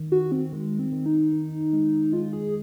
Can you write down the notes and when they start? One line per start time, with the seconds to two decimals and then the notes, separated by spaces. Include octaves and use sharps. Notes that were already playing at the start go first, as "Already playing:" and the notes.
Already playing: D#3
0.12 D#3 F#4
0.32 C4
0.53 D#3 G#3
0.79 C4
0.92 D#3
1.06 D#4
1.32 D#3
1.73 G#3
2.13 G#3 F4
2.33 G#4